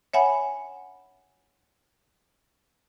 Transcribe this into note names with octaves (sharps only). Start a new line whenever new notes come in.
C#5 E5 F#5 G#5 B5